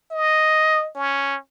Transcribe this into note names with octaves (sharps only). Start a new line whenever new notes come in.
D#5
C#4